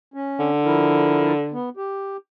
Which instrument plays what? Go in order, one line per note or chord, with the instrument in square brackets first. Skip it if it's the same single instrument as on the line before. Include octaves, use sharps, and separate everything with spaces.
[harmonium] C#4
[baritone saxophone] D3
[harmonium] F3 E4 A#4
B3
G4